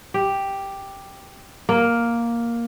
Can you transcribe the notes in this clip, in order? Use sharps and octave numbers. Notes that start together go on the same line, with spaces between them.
G4
A#3